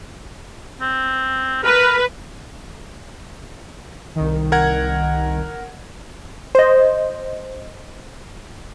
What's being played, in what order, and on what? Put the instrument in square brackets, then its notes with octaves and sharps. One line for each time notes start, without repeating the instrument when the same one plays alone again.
[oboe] C4
[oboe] A#4 [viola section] B4
[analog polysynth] C2 D#3
[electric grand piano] A#4 F#5 G#6
[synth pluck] C5 D#5